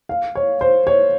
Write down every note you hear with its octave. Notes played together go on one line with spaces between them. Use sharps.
F5
C#5
C5
C#5